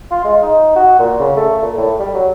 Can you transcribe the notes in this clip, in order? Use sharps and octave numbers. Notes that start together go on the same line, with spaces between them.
F4
G#3
D#4
F#4
A#2
C#3
A3
A#2
A2
G3
F#3